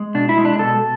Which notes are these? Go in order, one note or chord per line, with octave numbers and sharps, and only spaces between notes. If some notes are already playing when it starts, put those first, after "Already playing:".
Already playing: G#3
B2 D4
E4
G#3
D4
B2 A4